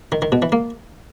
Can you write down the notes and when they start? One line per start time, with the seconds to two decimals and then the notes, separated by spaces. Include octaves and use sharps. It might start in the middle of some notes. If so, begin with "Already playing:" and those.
0.12 D#3
0.22 D#3
0.32 B2
0.42 E3
0.52 A#3